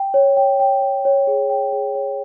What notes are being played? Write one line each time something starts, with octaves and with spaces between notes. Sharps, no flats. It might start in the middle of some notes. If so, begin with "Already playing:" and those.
Already playing: G5
C#5
G5
G5
C#5
C#5
G#4
G5
G#4
C#5